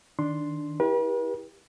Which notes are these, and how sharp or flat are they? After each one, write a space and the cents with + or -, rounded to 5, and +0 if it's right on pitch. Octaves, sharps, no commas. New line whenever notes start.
D#3 +0 D4 +0 C6 +0
E4 -15 G4 +15 B4 -45